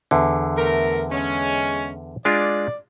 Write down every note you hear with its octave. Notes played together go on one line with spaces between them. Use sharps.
E2 D3
A3 A#4
G#3 C#4
G#3 D4 F4 D5